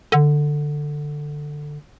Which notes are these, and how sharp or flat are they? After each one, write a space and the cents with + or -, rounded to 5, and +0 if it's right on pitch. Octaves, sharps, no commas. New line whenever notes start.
D3 +10